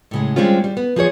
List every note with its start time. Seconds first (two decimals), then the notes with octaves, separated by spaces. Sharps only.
0.11 A2 C#3 G#3
0.36 G3 G#3 C4 C#4 F4
0.64 G3
0.77 B3
0.96 F3 F4 G#4 C#5